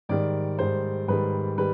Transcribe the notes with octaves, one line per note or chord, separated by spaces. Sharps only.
G#2 D#3 G3 D5
G#2 D#3 G3 C5
G#2 D#3 G3 B4
D#3 G3 B4